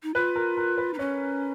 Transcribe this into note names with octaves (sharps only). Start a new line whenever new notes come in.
D#4
F4 B4
A#4
A#4
B4
D#4
C#4 C#5